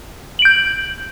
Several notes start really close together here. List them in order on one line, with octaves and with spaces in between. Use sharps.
F#7 D7 G6